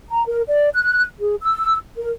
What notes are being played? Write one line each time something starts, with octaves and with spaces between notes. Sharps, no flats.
A#5
A#4
D5
F#6
G#4
E6
A#4